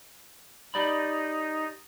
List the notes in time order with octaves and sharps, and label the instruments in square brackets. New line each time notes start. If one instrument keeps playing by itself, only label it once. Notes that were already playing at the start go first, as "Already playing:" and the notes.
[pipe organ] D#4 [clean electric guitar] G4 D5 B5